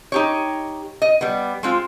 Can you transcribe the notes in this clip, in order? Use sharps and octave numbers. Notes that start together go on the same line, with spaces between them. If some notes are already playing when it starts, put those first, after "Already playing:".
D#4 G4 C#5
D#5
G3 B3
G#3 C4 F4